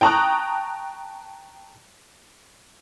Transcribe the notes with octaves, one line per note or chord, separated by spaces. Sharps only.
G5 A5 A#5 C#6 D#6 F#6